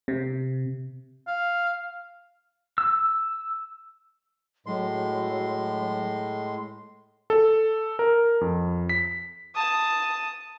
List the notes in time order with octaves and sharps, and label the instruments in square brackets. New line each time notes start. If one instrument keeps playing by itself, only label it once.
[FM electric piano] C3
[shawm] F5
[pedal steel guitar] E6
[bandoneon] A2 G#3 C6 [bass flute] F#3
[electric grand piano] A4
A#4
F2
B6
[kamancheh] A5 D#6